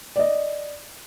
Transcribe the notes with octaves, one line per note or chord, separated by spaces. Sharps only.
D5 D#5